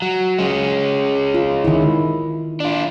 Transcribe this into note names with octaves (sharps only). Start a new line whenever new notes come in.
F#3
G#3 C#4
F4
D#3 E4
D4 F4